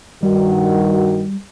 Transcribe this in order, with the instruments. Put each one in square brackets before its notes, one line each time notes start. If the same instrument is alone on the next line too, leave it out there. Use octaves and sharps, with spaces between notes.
[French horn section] G2 D#3 F#4 [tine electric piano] G3